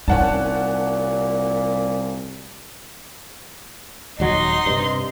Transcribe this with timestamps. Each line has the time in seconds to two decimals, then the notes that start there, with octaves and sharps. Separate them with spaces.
0.08 C2 A#2 C#4 D#4 F#5 A5
4.20 D#1 F#3 D#4 C6
4.66 G2 C3